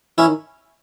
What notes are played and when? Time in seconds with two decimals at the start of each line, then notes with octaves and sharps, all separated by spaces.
0.18 E3 C#4 E4
0.27 D#3